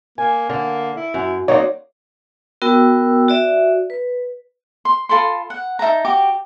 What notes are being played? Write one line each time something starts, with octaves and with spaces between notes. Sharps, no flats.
A#3 G#5
D3 A#3
E4
F#2
F#3 A#3 C4 D#4 C#5 D5
B3 F#4 A#4 G5 E6
F#4 D5 E5
B4
C6
F4 A4 B5 C6
F#5
D#4 E5 A5 A#5
F#4 G4 D6